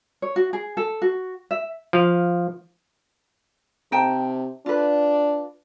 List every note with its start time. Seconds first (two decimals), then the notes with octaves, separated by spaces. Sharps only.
0.22 C#5
0.36 F#4
0.53 G#4
0.77 A4
1.02 F#4
1.51 E5
1.93 F3 F5
3.92 C3 D#4 G5 A5
4.66 D4 F4 B4